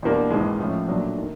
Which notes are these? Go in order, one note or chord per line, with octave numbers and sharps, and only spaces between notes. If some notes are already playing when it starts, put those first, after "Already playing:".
E2 B2 G3 A#3 D4
G#1 G#2 E3 G#3
A2 F3 A3 C#4
A#2 F#3 A3 D4
D#3